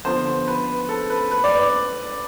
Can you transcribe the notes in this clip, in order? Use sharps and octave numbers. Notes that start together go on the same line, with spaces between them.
D3 F3 B3 C5
B4
A4
B4
B4
D5